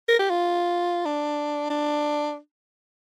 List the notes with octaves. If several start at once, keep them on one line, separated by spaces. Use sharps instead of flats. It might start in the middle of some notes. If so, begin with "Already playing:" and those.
A#4
G4
F4
D4
D4